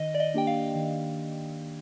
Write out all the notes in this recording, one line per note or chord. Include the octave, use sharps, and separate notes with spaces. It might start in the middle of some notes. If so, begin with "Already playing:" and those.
Already playing: D#3 D#5
D5
D#5
A#3 D4 G4 G5
F5
D#3